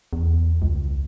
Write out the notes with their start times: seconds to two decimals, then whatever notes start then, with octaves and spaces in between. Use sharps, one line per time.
0.13 E2
0.62 C#2